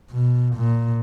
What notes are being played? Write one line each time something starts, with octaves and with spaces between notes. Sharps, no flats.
B2
A#2